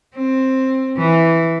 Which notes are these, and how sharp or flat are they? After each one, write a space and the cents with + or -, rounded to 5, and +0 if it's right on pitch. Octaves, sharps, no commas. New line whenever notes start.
C4 +10
E3 +0